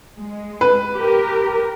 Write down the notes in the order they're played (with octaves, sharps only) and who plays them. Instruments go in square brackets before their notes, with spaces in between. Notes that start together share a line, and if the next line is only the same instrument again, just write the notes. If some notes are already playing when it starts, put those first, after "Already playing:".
[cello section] G#3
[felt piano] B4
[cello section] G4 A#4